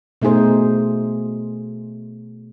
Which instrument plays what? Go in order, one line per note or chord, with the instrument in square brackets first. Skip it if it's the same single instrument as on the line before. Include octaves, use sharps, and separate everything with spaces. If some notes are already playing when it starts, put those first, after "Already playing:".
[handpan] B2 A3 D#4 G#4 C5